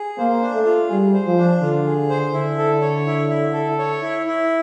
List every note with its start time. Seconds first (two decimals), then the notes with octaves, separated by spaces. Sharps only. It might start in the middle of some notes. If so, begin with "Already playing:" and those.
Already playing: G#4
0.18 A#3 C5
0.42 D4
0.54 A3
0.65 F4
0.89 G3 G#4
1.13 C5
1.26 F3
1.37 D4
1.61 D3 F4
1.86 G#4
2.09 C5
2.33 D3 E4
2.58 A4
2.82 C#5
3.06 E4
3.29 E4
3.53 A4
3.79 C#5
4.02 E4
4.26 E4